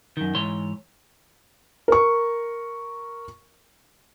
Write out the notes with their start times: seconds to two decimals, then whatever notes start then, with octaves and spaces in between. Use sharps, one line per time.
0.17 F#2 D#3
0.35 G#2 E3 C#5 C6
1.88 A#4 C#6